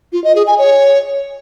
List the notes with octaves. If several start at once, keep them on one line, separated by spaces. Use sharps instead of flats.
F4
D#5
G#4
G#5
C#5